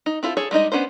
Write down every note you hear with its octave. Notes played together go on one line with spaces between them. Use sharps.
D#4
C4 E4 F4 A4
G#4 A4 C#5
G3 G#3 D#4 D#5
B3 C#4 D4 C5